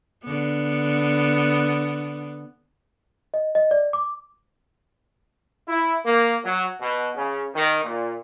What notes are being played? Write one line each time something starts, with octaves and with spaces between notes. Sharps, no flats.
D3 B3
D#5
D#5
D5
D6
E4
A#3
F#3
B2
C#3
D#3
A#2